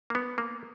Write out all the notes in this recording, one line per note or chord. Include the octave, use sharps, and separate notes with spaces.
A#3
B3
A#3